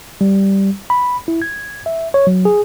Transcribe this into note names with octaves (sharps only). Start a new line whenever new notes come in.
G3
B5
E4
G#6
E5
C#5
F#3
G#4